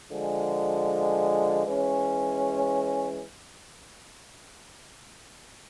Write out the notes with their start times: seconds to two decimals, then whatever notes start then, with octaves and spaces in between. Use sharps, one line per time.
0.11 D3 F3 G#3
1.67 E3 G#3 C#4